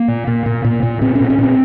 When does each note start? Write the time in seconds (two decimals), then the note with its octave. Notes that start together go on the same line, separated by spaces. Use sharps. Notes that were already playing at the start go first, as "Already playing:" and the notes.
Already playing: A#3
0.08 A#2
0.27 A#2
0.46 A#2
0.64 A#2
0.83 A#2
1.01 A#2 C4
1.15 C#4
1.21 A#2
1.30 C#4
1.38 A#2 C4